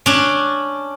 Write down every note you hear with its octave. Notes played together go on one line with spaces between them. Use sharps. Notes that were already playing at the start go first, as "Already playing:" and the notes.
C#4 D4